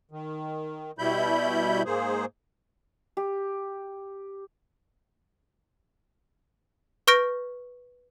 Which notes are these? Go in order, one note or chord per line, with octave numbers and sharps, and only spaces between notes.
D#3
B2 G3 E4 B5 G6
G#2 A#3 G#4 C5
G4
B4 C#6 F6 G6 A#6 D7